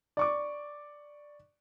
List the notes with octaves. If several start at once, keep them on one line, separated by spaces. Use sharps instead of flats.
D5 C#6 D6